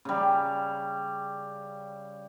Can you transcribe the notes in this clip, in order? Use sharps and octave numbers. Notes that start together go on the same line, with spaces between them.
C#3 G3